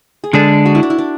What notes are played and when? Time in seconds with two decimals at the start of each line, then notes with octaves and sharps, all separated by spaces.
0.24 G#4
0.33 D3 G#3 D4 A4
0.66 F#4
0.75 E4
0.83 D4
0.90 E4
0.98 D4